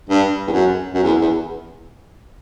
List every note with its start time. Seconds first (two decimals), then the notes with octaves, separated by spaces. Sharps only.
0.09 G2
0.47 E2
0.52 F#2
0.94 F#2
1.03 E2
1.21 E2